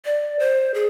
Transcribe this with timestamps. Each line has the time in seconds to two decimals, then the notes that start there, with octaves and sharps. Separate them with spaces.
0.05 D5
0.39 C5
0.74 G#4